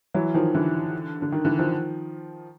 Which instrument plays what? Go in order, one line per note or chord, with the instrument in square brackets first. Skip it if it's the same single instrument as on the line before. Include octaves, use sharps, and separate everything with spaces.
[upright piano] E3 F#3
D#3 F3
D3 E3
D3
D#3
D3 E3
D#3 F3